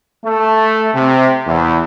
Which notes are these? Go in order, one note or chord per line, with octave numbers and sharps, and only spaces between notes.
A3
C3
E2